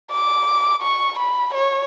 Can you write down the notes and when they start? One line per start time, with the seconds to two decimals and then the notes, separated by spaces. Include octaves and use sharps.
0.11 D6
0.82 C#6
1.19 B5
1.54 C#5